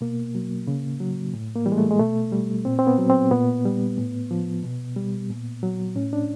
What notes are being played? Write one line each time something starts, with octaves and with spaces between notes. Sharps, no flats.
B2 A#3
F#3
C#3
F#3
A2
A#3
E3 G3
G#3
A3
G#3
B2 A3
G3
A#2 C4
C4
B3
F#3
C4
A#2 B3
G3
A2
F3
B2
G3
A#2
F#3
A2 C#4
D4